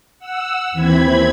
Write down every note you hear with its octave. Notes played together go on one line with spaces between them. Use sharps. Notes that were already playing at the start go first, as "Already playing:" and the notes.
F#5 E6
D#2 E3 C4 B5 G#6